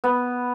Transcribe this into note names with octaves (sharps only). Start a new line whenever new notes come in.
B3